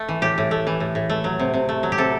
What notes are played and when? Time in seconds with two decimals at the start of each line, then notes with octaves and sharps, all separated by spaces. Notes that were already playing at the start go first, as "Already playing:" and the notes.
Already playing: A3
0.08 E3
0.22 A2 G4
0.38 A2
0.51 A3
0.67 E3
0.80 A2
0.95 A2
1.10 A3
1.24 F#3
1.40 C3
1.54 C3
1.69 A3
1.83 F#3
1.92 G4
1.98 C3 A4